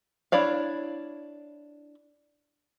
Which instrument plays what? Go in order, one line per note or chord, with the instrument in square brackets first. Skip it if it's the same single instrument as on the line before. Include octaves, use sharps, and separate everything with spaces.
[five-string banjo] D4 E4 C#5 D5 F5